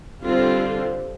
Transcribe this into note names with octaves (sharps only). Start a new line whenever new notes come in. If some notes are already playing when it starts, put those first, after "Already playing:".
D3 G3 C4 F4